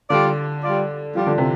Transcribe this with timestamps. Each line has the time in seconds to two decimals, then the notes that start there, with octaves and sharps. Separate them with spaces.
0.10 D3 G3 F4 D5
0.63 G3 F4 D5
1.15 F3 G3 F4 D5
1.27 D3
1.38 C3